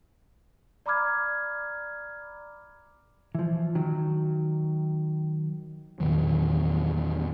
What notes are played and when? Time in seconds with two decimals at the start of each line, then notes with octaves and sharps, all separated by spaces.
0.86 D5 A#5 B5 D6 F6 G#6
3.35 E3 F3
3.75 D#3 F#3
6.00 E2 A#2 D#3 F#3